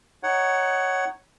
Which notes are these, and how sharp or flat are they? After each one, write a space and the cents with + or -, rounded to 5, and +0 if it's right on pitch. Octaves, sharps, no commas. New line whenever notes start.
D#4 +0 C#5 +0 F#5 +15